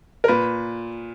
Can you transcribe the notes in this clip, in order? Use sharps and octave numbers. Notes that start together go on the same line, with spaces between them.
A#4
A#2 B4